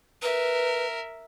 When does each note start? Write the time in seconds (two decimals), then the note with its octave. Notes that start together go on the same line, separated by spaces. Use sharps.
0.22 A#4 B4 E5